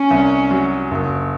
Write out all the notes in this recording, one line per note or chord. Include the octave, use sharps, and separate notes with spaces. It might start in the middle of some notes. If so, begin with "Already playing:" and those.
Already playing: C#4
C2
F#3
F#1